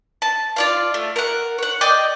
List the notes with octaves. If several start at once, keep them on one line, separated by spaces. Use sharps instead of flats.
A5
F4 D5 F5
A3
A#4 F#5
C#5 F#5
D5 D#5 G5 D6